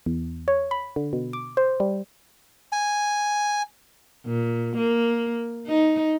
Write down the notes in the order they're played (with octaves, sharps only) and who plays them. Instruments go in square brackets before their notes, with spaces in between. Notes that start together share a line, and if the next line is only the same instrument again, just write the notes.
[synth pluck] E2
C#5
B5
D3
B2
D6
C5
G3
[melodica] G#5
[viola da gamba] A#2
A#3
D#4